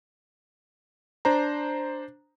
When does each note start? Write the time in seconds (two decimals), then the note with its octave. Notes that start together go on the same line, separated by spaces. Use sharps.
1.25 D4 C5 A#5